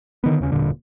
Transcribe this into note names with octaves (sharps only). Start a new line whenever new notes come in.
D3 D#3 B3
D#2 C#3 C#4
E1 G2 A#2 D3